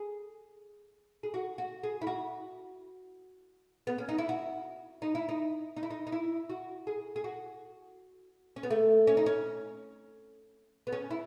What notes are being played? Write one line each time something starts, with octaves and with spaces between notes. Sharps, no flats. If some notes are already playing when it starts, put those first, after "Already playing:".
Already playing: G#4
G#4
F#4
F#4
G#4
E4
F#4
B3
C#4
D#4
E4
F#4
D#4
E4
D#4
D#4
E4
D#4
D#4
E4
F#4
G#4
G#4
F#4
C#4
B3
A3
C#4
D#4
C#4
B3
C#4
E4